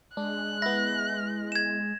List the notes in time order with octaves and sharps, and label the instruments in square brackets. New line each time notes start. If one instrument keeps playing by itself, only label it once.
[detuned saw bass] G#3 [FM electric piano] D4 [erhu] F#6
[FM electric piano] B3 E4 [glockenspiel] A#6
[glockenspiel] G#6 E7